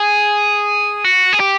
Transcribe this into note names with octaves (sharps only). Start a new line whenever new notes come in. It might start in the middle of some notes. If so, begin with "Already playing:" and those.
Already playing: G#4
F#4
G#4
G4